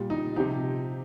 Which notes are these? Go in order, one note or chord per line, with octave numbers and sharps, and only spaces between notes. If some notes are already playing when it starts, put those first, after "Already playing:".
Already playing: A#2 G3
D#4
C3 F3 D#4 G4